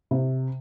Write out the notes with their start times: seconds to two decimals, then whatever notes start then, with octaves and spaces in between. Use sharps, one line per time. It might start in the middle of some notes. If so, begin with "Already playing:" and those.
0.11 C3